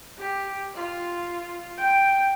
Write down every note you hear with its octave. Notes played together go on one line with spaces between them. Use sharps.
G4
F4
G5